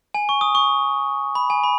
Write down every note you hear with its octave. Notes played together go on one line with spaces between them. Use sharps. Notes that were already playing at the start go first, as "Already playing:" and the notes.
G#5
C#6
D#6
C#6
B5
G#5
B5